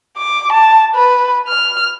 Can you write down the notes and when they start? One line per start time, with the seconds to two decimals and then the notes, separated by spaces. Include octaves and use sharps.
0.18 D6
0.53 A5
0.95 B4
1.48 F6